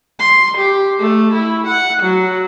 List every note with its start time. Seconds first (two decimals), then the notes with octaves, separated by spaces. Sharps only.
0.19 C6
0.58 G4
0.99 A3
1.33 E4
1.68 F#5
2.02 F#3